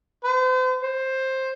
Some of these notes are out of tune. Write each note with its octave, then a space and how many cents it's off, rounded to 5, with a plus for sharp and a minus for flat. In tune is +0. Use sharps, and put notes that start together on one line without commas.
C5 -40
C5 +10